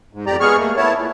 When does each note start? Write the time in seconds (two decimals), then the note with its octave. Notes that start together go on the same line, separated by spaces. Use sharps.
0.13 G#2
0.26 F2 G4 D5 A#5
0.40 G#3 B3 G#4 C#6 F6
0.58 A3 A#3
0.77 A3 B3 E4 C#5 A5
0.96 A#2